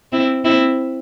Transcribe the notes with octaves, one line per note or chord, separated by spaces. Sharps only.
C4 E4
C4 E4